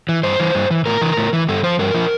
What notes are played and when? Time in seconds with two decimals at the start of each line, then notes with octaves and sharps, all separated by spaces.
0.09 E3
0.23 G2 C5
0.40 E3
0.55 G2
0.71 E3
0.86 A2 A#4
1.02 E3
1.17 A2
1.33 E3
1.49 G2 A4
1.63 F3 C5
1.79 G2 A#4
1.95 F3